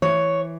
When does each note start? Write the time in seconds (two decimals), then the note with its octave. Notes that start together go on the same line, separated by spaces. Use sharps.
0.02 E3 C#5